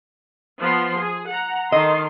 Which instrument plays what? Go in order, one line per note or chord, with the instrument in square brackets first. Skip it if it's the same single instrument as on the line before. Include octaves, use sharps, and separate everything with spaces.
[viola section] F3 B3 C6
G#4
F#5 A#5
[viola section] D#3 A4 C6 [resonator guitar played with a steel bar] D#5